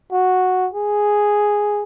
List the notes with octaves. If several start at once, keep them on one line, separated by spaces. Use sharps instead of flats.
F#4
G#4